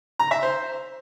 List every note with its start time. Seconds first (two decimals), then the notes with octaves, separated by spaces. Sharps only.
0.19 A#5
0.31 E5
0.43 C5